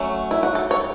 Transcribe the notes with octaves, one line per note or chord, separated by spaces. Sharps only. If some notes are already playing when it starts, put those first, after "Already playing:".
Already playing: F#3 A3 C#4
E4
F#4
A4
C#5